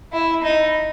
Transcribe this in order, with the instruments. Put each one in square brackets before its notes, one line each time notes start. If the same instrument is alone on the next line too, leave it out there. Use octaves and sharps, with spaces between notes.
[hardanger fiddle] E4
D#4